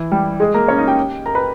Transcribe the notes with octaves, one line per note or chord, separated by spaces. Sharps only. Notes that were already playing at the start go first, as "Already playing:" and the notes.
Already playing: E3 E4
G3 G4
G#3 G#4
A#3 A#4
C#4 C#5
D#4 D#5
G4 G5
A#4 A#5
B4 B5